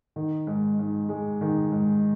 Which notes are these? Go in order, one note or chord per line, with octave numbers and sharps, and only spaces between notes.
D#3
G#2
G#2
G#3
D#3
G#2